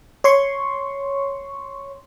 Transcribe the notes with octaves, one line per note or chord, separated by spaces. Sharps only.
C#5 C6 C#6